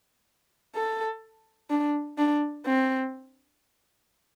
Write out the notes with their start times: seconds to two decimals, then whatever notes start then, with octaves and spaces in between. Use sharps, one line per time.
0.75 A4
1.70 D4
2.18 D4
2.66 C4